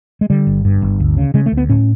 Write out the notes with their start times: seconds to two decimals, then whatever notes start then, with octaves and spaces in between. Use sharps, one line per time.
0.21 G#3
0.30 D3 G3
0.47 G1
0.65 G2
0.82 G1
1.00 D2
1.17 C#3
1.34 C#3 G#3
1.46 A3
1.52 D2
1.57 B3
1.69 A2 C#4